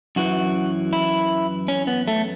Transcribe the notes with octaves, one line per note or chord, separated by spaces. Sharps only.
F#2 E3 F#4
E4
C#4
B3
A3